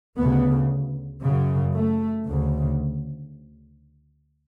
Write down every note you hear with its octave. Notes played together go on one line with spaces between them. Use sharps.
D2 C#3 B3
F#2 C#3
A3
D2 C#3